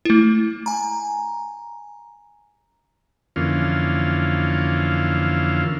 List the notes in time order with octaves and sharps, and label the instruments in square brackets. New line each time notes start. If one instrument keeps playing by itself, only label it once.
[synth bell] A3 E4
G#5 A#5
[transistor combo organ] F2 D3 E3 A#3 C#4 F4